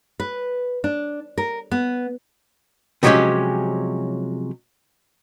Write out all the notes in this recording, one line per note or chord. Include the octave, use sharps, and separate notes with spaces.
B4
D4
A#4
B3
C3 F3 F#3 G#3 C#4 G4